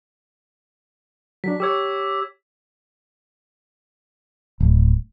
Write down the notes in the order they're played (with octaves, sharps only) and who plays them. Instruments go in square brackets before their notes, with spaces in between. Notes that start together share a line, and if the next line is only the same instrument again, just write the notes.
[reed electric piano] F#3 D4 [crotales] B6
[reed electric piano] G4 C#5 [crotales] D6 E6 G#6
[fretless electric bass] D1